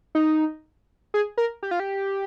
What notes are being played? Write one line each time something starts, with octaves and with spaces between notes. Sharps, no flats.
D#4
G#4
A#4
G4
F4
G4